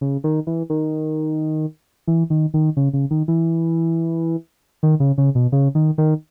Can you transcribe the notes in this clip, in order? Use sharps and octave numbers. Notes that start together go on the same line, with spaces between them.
C#3
D#3
E3
D#3
E3
D#3
D#3
C#3
C#3
D#3
E3
D#3
C#3
C#3
B2
C#3
D#3
D#3